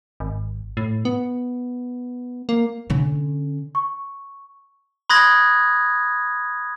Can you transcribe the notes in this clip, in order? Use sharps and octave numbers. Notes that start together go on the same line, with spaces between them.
G#1
A2
B3
A#3
D3 C#4
C#6
B5 C6 D#6 F#6 G#6 A#6